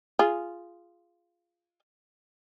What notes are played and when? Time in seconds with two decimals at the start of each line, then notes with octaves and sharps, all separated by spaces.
0.19 F4 G#4